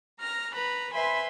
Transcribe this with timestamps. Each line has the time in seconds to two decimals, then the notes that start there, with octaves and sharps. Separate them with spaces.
0.20 A#5 F6 A#6
0.54 B4 A#5 B5 F#6
0.92 B4 C5 E5 G#5 B5 C6